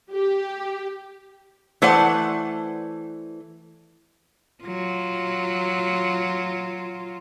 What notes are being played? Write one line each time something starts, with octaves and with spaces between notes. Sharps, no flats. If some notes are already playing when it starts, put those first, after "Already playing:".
G4
E3 A3 C5 D5 F#5
F#3 F4